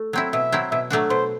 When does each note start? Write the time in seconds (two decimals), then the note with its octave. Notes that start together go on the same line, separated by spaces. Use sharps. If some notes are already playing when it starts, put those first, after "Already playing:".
Already playing: A3
0.13 F#3 C4 E4
0.33 B2 E5
0.52 F#3 C4 E4
0.71 B2 E5
0.90 F#3 A3 D4 F#4
1.10 B2 C5